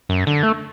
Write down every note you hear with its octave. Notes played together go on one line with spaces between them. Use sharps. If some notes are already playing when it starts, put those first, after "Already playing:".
F#2
D3
A3